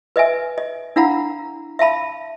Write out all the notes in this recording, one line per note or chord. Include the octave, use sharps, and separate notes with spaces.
B4 D#5 E5 G#5
D#5
D4 E4 F5 F#5 A#5 B5
E5 F5 A5 B5